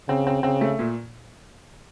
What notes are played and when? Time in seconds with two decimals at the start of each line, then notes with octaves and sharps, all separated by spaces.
0.08 C#3 C4
0.27 C4
0.43 C#3 C4
0.61 A3
0.79 A#2